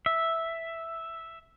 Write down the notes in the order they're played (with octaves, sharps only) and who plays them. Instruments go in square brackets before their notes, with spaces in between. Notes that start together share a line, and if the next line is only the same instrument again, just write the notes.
[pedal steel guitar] E5